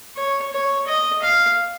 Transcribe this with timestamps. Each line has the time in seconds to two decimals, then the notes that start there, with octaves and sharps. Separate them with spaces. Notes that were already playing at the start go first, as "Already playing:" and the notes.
0.16 C#5
0.52 C#5
0.87 D#5
1.23 F5